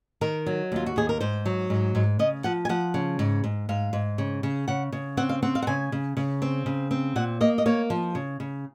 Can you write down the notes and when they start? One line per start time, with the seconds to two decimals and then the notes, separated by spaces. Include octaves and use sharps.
0.21 D#3 A#4
0.46 F#3
0.72 D#2 F4
0.86 F#4
0.96 D#2 G#4
1.09 A#4
1.20 G#2 C5
1.46 F#3
1.70 G#2
1.95 G#2
2.19 C#3 D#5
2.44 F3 F#5
2.65 G#5
2.69 F3 F#5
2.94 C#3
3.19 G#2
3.44 G#2
3.69 G#2 F5
3.93 G#2
4.18 C#3
4.43 C#3
4.68 C#3 F#5
4.92 C#3
5.17 C4 F#5
5.29 F5
5.43 C4 F#5
5.55 F5
5.62 F#5
5.67 C#3 G#5
5.92 C#3
6.17 C#3
6.42 C4
6.66 C#3
6.91 C4
7.16 A#2 F#5
7.41 A#3 D#5
7.58 D#5
7.66 A#3 C#5
7.90 F3
8.15 C#3
8.40 C#3